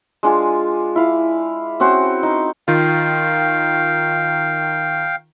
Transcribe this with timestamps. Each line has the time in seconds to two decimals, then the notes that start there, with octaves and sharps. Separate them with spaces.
0.23 G#3 D4 F4 G#5
0.96 E4 F5
1.80 C4 C#4 F#4 C5
2.23 D#4
2.68 D#3 F4 F5 G5